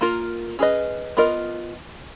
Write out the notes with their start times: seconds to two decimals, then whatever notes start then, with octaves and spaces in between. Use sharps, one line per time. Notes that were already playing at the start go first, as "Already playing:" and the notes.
0.01 A#3 F4 A#4
0.59 C#4 G#4 B4 D#5
1.17 B3 F4 A#4 D#5